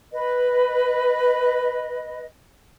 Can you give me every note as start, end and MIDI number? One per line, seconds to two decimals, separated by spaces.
0.13 2.26 71
0.13 2.26 75